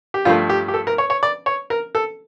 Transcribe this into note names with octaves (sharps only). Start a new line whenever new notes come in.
G4
G2 F3 A3 F4
G4
G4
A4
A#4
C#5
C#5
D5
C#5
A#4
A4